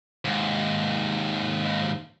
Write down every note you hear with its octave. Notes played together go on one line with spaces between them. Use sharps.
D#2 G#2